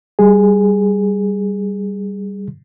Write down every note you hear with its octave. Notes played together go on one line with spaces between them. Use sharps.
G3 G#4